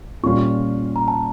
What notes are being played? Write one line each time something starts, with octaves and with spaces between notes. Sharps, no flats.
A#2 G3 C#4 F4 C#6
A#5
A5